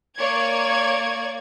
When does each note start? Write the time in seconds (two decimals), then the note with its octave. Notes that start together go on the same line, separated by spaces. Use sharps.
0.17 A#3 C#5 D5 C#6 G#6